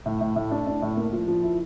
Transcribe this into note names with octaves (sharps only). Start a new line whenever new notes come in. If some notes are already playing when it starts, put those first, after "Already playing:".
A2
A2
A2
D4
D4
A2
A#3
F3
F3
E4